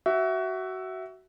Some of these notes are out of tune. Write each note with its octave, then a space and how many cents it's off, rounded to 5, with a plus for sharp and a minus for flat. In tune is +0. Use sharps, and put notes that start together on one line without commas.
F#4 +20 E5 +0